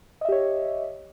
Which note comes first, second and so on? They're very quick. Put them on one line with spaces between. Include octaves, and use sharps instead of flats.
D#5 E5 G4 C#5